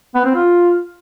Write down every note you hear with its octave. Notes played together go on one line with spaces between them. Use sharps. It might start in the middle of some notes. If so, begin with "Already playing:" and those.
B3
C4
F4